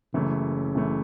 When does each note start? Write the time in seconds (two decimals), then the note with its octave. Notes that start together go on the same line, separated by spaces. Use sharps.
0.14 F#1 F#2 C#3 E3 A3
0.75 F#1 F#2 E3 A3